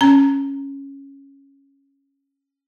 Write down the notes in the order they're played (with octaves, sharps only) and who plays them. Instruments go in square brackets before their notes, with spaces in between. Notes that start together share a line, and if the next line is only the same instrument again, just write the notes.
[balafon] C#4 A#5